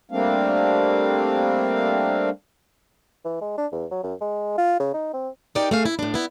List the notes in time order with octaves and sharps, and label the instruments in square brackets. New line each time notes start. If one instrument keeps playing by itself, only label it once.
[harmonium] G3 A3 A#3 C4 D4 F5
[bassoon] E3
G#3
D4
E2
F#3
F#2
G#3
F4
C#3
D#4
C4
[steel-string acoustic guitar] D#4 G4 A#4 D5 G5
A3 G#4 F5
E4
A2 D4
B3 E4